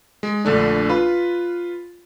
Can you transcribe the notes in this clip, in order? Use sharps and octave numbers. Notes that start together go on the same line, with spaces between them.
G#3
A#1 D3 A3 D4
F4 B4 B5